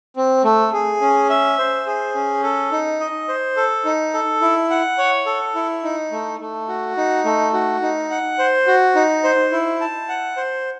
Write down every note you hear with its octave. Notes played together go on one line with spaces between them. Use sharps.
C4
A3
G#4
C#4
E5
C5
G#4
C#4
A4
D#4
D#5
C5
A4
D#4
A4
E4
F#5
C#5
A4
E4
D#4
A3
A3
F#4
D#4
A3
F#4
D#4
F#5
C5
F#4
D#4
C5
E4
A5
F#5
C5